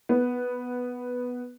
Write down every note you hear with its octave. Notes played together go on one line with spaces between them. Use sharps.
B3